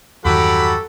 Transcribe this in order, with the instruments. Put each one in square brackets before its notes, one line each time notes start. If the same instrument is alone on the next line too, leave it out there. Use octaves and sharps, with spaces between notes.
[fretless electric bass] E2 G2 D#3 [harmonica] F#3 F#4 G4 [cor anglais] A4 [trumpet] B5